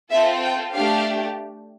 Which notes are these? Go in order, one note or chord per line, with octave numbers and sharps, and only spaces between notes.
C4 F4 A4 E5
G5
A3 D4 G4 F5